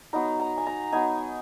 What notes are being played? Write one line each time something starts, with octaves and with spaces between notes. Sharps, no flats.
F#3 B3 D#4 A#5
A#5
G#5
A#5
F#3 B3 D#4 G#5